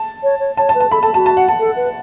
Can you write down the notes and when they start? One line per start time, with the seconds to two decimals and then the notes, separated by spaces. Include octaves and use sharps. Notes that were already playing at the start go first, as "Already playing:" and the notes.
Already playing: A5
0.23 C#5
0.40 C#5
0.57 C#5 A5
0.69 A5
0.75 B4
0.80 A5
0.91 A4 B5
1.03 A4 A5
1.14 F#4 A5
1.26 A5
1.37 F#5
1.48 A5
1.59 A4
1.76 B4